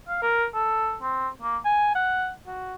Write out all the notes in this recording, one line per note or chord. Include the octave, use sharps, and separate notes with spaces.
F5
A#4
A4
C4
A#3
G#5
F#5
F#4